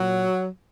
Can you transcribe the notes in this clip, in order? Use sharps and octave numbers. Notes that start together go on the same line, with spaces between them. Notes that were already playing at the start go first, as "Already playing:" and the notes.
Already playing: A#2 F#3